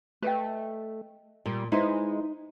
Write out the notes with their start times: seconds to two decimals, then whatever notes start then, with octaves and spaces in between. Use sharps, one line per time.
0.22 A3 B4 D#5 G5
1.46 A#2 G3
1.72 G#3 D#4 E4 B4 C5